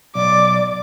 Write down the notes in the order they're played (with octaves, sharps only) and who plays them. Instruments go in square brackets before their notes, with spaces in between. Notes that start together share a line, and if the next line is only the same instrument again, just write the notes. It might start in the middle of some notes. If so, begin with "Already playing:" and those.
[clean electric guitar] B1 [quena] D5 [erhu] D6